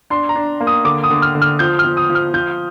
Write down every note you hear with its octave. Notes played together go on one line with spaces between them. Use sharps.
D4 C6
A#5
D4
A#3
D#6
D3 D6
D#6
D3
F6
D3
F6
F3 G6
F6
F3
D#6
F3
F6
F3 G6